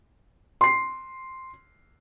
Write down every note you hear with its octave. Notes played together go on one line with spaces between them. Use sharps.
C6 C7